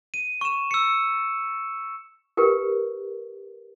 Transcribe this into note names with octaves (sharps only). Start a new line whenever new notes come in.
D#7
C#6 E7
E6 C#7
G4 A#4 B4